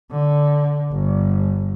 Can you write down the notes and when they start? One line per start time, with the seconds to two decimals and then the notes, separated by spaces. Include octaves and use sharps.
0.11 D3
0.91 G1